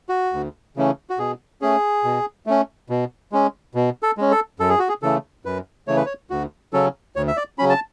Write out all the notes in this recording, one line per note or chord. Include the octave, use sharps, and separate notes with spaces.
F#4
D2
C#3 E3 A3 C#4
F#4
B2 G#4
A3 C#4 G#4
B2
A3 C#4
B2
G#3 C#4
B2
A4
G#3 C#4
A4
F#2 A4
G#4
F#4
G#4
C#3 E3 A3 A4
F#2 B4
C#3 E3 A3 C#5
B4
C#5
D2 F#4
C#3 F#3 C#4 A4
D2 C#5
E5
D5
C#3 F#3 C#4 B5
A5